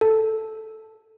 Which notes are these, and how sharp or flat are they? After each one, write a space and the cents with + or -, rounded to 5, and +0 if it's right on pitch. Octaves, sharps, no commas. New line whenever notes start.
A4 +0